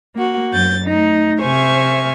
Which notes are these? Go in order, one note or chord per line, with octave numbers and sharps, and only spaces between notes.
A#3 F#4
F#2 G6 A6
A3 D#4
C3 C5 E5 G#5 C#6 F6